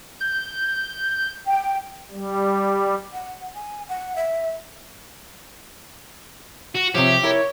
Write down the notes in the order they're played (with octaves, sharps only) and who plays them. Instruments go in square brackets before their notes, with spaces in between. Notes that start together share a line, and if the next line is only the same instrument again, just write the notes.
[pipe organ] G6
[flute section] G5
[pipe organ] G3
[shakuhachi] F#5
G#5
F#5
E5
[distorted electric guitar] F#4
[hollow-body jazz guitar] C3 F3 [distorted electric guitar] G4 [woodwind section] G#4 C#5 E5
[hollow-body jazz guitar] E4 A#4 [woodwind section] C#5